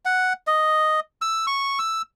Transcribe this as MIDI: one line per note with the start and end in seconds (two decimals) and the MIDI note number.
0.05 0.33 78
0.47 1.00 75
1.22 1.46 88
1.47 1.79 85
1.79 2.02 88